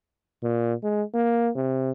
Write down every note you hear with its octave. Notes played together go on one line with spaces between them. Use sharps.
A#2
G#3
A#3
C3